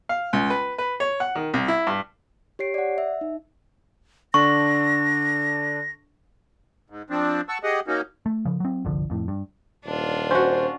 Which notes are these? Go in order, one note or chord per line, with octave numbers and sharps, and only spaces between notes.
F5
C#2
B4
B4
C#5
F#5
D#3
C2
E4
G2
G4 C#5 C7 D7
D5 F#5
E5
D#4
D3 D4 A4 C#6 A#6
G#2
F3 C4 D4
F#5 A5 C#6 E6
G4 G#4 D#5 F#5
A#3 C#4 D#4 F#4
A3
C#3 F3
F#3 C4
G1 C2 D3 F3
F2 A2
G2
D#1 D4 F4
C#4 F#4 C5